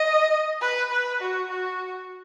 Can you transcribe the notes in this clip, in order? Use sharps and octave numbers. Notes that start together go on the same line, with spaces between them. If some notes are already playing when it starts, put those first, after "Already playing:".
Already playing: D#5
B4
B4
F#4
F#4